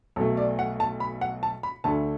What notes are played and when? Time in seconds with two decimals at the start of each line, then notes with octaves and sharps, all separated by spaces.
0.16 B1 A4
0.19 B2 A3
0.37 D5
0.59 F#5
0.80 A5
1.00 B5
1.21 F#5
1.43 A5
1.63 B5
1.84 D2 D3 A3 A5